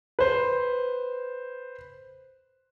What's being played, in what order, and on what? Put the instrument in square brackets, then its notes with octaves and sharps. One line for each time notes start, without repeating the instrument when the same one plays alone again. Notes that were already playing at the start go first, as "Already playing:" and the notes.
[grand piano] B4 C5